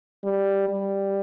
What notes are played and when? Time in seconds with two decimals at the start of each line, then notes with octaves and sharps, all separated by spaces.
0.24 G3
0.69 G3